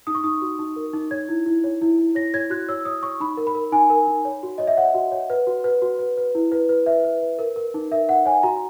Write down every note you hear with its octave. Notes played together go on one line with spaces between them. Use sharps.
D#4 D#6
C#6
D#4 D#6
F#4
D#4
A#4
D#4
C#5 G#6
E4
E4
C#5
E4
E4
C#5 A#6
C#5 G#6
F#4 F#6
C#5 E6
C#5 D#6
C#5 C#6
D#4 B5
A#4
B5
A#4
D#4 G#5
A#4
D#4
C#5
F#4
C#5 D#5
E5
C#5 F#5
F#4
C#5
B4
F#4
B4
F#4
B4
B4
E4
B4
B4
B4 E5
B4
B4
A#4
A#4
D#4
A#4 E5
D#4 F#5
C#5 G#5
F#4 A#5